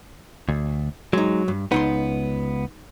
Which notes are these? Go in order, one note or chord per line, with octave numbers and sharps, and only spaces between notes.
D2
F#3 G#3 D#4
G2
C#2 B3 D#4 B5 C6